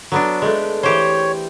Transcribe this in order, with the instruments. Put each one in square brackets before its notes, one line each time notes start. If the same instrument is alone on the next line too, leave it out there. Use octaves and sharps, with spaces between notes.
[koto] F#3 B3 D4
G#3 A3
[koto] E3 G4 C5 [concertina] C#5